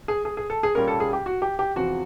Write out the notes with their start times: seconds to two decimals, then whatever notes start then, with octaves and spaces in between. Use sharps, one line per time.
0.08 G#4
0.25 G#4
0.37 G#4
0.50 A4
0.63 G#4
0.75 A#2 G3 A#3 C#4 A#4
0.88 A4
1.00 G#4
1.13 G4
1.26 F#4
1.42 G4
1.59 G4
1.76 E2 C3 F3 F#4